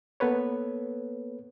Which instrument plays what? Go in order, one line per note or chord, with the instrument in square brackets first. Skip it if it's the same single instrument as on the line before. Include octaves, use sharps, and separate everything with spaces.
[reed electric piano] A#3 B3 A4 B4 C#5